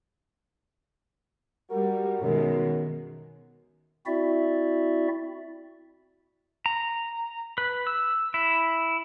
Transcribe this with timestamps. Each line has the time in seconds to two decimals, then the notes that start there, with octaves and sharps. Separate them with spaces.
1.70 G3 F#4 A#4
2.21 F#2 B2 D#3 G#3
4.06 C4 E4 F#4 D5 E5
6.66 A#5
7.58 B4
7.87 E6
8.34 E4